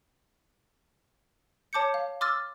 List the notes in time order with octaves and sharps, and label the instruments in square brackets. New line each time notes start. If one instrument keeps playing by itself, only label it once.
[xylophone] C#5 A5 D6 G6 C#7
F5
C6 D6 E6 F6 A6